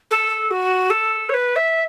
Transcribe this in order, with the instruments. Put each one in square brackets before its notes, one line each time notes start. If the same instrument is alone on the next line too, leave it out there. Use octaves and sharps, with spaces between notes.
[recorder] A4
F#4
A4
C#5
B4
E5